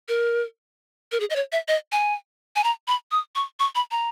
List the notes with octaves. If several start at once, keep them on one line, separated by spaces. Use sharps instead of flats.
A#4
A#4
G#4
D#5
C#5
E5
D#5
G#5
G#5
A#5
B5
D#6
C#6
C#6
B5
A#5